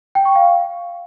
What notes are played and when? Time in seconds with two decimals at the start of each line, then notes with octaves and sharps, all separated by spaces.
0.15 G5
0.25 C#6
0.35 F5